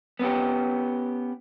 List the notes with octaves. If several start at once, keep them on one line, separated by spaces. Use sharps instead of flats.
B3 C#4 G4